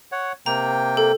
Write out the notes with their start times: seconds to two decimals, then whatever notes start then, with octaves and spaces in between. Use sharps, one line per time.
0.12 C#5 F#5
0.46 C3 A#3 G5 A#5
0.97 A4